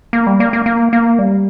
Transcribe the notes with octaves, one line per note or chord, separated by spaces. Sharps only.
A#3
G3
A#3
A#3
A#3
A#3
G3